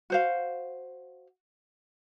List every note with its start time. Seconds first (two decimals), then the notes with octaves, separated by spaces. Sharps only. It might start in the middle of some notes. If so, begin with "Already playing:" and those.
0.10 F#4 C5 F5